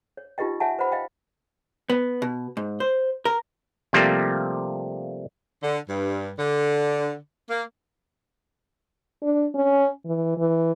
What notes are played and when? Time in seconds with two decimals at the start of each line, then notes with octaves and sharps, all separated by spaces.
0.17 C#5
0.38 D#4 F4 G4 B4 D#5 G5
0.60 C#5 D#5 E5 F#5 G#5 A5
0.79 B4 C5 D#5 F#5 B5
0.92 D#5 F5 G5
1.90 B3
2.22 B2
2.57 G#2
2.80 C5
3.25 A#4
3.93 C3 F3 G3 A3 A#3 C4
5.62 D3
5.89 G2
6.38 D3
7.49 A#3
9.23 D4
9.55 C#4
10.06 E3
10.37 E3